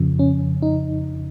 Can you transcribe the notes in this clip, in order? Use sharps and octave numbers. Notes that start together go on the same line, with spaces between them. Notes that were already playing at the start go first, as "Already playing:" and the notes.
Already playing: F2 C#3 F3
C#4
D#4